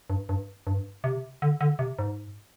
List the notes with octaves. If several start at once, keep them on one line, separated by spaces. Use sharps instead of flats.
G2
G2
G2
C3
D3
D3
C3
G#2